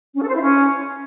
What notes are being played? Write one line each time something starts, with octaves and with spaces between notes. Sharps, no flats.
C#4
A4
C5
E4
C#4